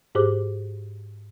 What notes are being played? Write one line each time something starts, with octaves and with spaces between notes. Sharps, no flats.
G#2 G4 G#4 C5 D6